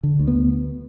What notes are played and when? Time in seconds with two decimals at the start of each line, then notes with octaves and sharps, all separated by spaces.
0.03 D3
0.19 D2
0.27 B3